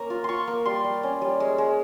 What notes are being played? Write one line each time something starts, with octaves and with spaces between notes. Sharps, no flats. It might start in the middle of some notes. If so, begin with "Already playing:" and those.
Already playing: A#3 C#4 A#5 C#6
F4
F4 C6 C#6
A#3
G3 C6
G3
C#4
G3
G#3
G#3